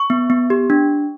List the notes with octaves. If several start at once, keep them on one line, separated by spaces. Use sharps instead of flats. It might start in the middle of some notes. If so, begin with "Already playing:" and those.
Already playing: C#6
B3
B3
G4
D4